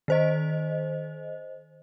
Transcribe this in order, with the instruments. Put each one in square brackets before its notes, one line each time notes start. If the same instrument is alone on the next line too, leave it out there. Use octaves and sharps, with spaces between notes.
[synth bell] D#3 C5 D#5